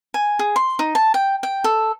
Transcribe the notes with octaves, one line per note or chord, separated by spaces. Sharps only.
G#5
G#4
C6
D#4
A5
G5
G5
A4